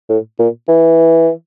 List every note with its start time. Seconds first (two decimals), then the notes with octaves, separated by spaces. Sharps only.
0.09 A2
0.39 A#2
0.68 E3